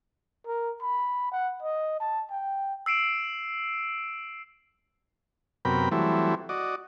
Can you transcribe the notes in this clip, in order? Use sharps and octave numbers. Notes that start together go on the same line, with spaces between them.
A#4
B5
F#5
D#5
A5
G5
E6 C7 D7 E7
F#2 C3 B3 A#4 G5 B5
E3 F#3 G3 A3 C4 E4
F#4 D5 D#5